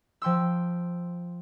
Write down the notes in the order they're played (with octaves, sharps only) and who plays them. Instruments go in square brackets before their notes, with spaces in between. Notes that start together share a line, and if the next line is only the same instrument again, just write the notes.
[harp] F3 G5 C6 E6